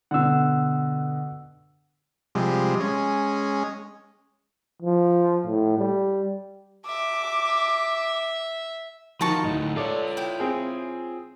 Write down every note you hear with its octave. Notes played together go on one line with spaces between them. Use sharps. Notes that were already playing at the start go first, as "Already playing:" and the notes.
B2 D3 F#5 E6
C3 F3 G3 G#3
G#3 C#4
F3
A2
G3
E5 D6
D#3 F3 F#4 A#4 A5 C#6
D2 A2 D#4
F4 A4 C#5 D5
E4 G5
C4 G#4